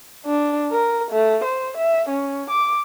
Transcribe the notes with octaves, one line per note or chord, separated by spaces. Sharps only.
D4
A#4
A3
C5
E5
C#4
D6